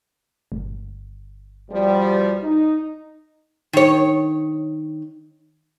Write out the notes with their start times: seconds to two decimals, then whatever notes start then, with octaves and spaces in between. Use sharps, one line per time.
0.52 G1
1.70 B2 F3 G3
2.43 D#4
3.73 D#3 C#5